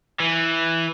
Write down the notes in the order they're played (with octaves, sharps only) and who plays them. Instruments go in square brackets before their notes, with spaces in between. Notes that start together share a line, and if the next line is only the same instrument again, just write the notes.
[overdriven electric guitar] E3